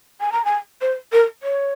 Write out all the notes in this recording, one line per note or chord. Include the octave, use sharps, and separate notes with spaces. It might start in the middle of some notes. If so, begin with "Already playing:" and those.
G#5
A#5
G#5
C5
A#4
C#5